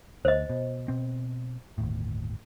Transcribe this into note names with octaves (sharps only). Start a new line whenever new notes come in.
D2 C5 D#5
B2
B2 C4
G1 D#2 A2